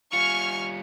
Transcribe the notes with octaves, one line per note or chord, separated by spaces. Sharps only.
G3 F4 G#5 C#6 F6 C#7